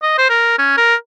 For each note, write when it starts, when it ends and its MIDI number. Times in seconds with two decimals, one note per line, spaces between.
0.02 0.16 75
0.18 0.29 72
0.29 0.55 70
0.59 0.74 61
0.77 0.95 70